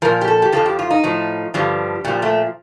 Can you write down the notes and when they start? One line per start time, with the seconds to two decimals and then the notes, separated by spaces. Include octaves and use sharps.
0.02 A#2 F3 A#4
0.21 G4
0.28 A4
0.42 G4
0.52 F2 C3 F3 A4
0.66 G4
0.79 F4
0.91 D#4
1.04 A2 F3
1.54 G2 D3 F3 G3
2.05 A#2 F3 G3
2.22 A3